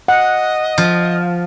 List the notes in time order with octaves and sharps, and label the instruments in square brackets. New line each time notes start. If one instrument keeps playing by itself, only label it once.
[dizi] D#5 [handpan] F#5
[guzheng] F3